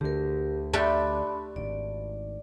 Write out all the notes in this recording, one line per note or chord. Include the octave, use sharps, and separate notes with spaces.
D2 D3 G4 A#4
A3 D4 G4 B5 C6
D1 G#1 D5